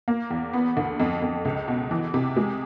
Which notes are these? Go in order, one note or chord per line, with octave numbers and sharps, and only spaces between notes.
A#3
E2
B3
D2
F2
F2
C#2
B2
E3
C3
G#3